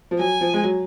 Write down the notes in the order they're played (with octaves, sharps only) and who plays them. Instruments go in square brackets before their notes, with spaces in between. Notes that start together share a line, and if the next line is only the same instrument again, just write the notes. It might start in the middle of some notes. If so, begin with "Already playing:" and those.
[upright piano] F3
[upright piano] F#3 [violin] G#5
[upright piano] F3
G#3
F#3